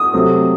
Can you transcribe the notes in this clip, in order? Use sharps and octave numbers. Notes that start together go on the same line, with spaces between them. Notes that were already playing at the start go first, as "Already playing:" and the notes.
Already playing: D#6
C3 F#3 A3 C4